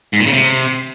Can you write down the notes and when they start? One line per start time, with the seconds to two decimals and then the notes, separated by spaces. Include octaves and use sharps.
0.13 G#2
0.20 A#2
0.26 C#3
0.33 C3